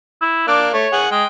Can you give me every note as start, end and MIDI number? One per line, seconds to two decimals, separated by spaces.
0.22 0.47 64
0.48 0.71 58
0.48 0.68 62
0.48 0.71 74
0.74 0.86 57
0.74 0.98 73
0.93 1.07 68
0.93 1.07 78
1.11 1.24 56
1.11 1.26 79